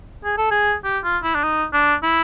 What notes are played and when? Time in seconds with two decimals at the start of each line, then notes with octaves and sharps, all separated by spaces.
0.24 G#4
0.38 A4
0.51 G#4
0.84 G4
1.04 F4
1.23 E4
1.35 D4
1.43 D#4
1.73 D4
2.03 E4